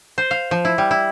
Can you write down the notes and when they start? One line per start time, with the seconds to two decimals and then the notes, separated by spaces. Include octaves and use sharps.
0.18 C5
0.31 F5
0.51 F3
0.65 E4
0.78 G3
0.91 E4